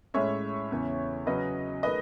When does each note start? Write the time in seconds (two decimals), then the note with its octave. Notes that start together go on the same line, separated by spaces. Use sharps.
0.14 A2 G#3 C#4 C#5 E5
0.70 E2 C#3 E3
1.26 C#3 F#3 C#4 B4 D#5
1.83 D#3 A3 B4 D#5